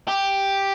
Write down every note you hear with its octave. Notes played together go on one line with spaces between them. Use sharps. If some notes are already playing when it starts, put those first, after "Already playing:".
G4